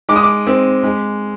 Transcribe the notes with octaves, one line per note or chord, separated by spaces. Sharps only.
G#3 D6
D#6
D6
C4
G#3